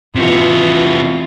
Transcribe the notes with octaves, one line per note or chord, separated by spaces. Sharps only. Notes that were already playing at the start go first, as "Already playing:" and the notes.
C3 E3 F4 F#4